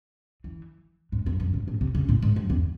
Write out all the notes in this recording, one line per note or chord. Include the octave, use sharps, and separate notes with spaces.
E3
G#2
F#2
F#2
G#2
A2
C3
C#3
A2
G#2
F#2
E2